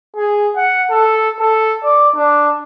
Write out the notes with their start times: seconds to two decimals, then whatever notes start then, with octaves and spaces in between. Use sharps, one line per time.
0.16 G#4
0.56 F#5
0.90 A4
1.39 A4
1.83 D5
2.16 D4